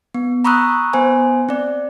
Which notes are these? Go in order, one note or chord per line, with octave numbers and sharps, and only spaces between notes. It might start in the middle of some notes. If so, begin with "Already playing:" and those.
B3
A#5 B5 C#6 D#6 E6 F#6
B3 C5 G#5
C4 D5